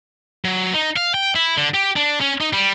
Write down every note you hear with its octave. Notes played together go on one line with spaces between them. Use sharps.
F#3
D#4
F5
G5
E4
D3
G4
D4
C#4
D#4
G3